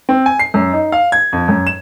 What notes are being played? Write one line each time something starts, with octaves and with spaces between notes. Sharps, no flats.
C4
G#5
C7
F#2
D#4
F5
G#6
F2
F#2
E7